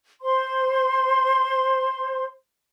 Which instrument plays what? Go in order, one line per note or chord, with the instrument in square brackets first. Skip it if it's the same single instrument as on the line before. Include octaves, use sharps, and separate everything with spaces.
[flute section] C5 C6